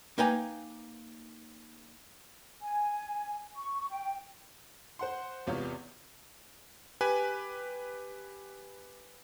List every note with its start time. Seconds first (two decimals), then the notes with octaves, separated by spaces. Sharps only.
0.18 A#3 D#4 B4 G5 G#5 A#5
2.62 G#5
3.56 C#6
3.89 G5
4.99 C5 F#5 C6
5.47 G#1 E2 C3 B3 F4 C#5
7.01 G4 B4 G#5